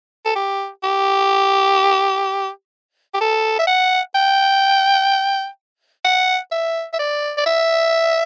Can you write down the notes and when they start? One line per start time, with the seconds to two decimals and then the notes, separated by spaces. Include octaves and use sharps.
0.26 A4
0.36 G4
0.84 G4
3.14 G4
3.21 A4
3.59 E5
3.67 F#5
4.15 G5
6.05 F#5
6.52 E5
6.94 E5
6.99 D5
7.38 D5
7.46 E5